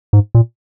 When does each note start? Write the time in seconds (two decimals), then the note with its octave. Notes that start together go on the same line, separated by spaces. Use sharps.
0.13 G#2
0.35 A#2